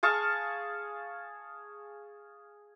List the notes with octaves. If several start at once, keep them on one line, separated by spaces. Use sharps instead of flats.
G#4 F5 A5 C#6